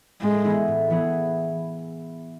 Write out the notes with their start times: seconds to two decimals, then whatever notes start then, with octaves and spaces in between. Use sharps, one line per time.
0.22 A2 G#3
0.45 E3 B3 E4 G#4
0.68 A2
0.90 E3 B3 E4 G#4